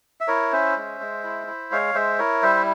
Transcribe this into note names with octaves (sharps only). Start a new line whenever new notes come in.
E5
E4 A#4 C#5
C#4 C5 E5
G#3
G#3
E4
E4
G#3 C#5 F5
G#3 C5 E5
E4 A#4 C#5
G3 C5 E5